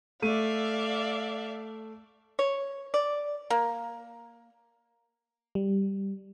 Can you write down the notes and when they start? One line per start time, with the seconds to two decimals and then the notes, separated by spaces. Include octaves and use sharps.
0.22 A3 D5 E5 F5 D#7
2.39 C#5
2.94 D5
3.50 A#3
5.55 G3